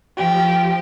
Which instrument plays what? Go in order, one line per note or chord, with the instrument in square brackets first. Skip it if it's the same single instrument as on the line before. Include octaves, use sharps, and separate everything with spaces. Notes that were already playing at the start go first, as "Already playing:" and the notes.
[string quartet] F3 G4